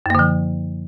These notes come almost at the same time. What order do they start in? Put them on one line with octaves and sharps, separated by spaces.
F#2 A#3 D3 F3